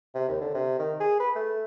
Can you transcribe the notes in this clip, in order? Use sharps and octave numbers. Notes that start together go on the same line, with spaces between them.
C3
D#2
D3
C3
D#3
G#4
B4
A3